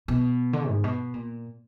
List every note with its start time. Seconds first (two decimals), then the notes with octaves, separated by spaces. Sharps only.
0.08 B2
0.53 D3
0.69 G#2
0.84 B2
1.14 A#2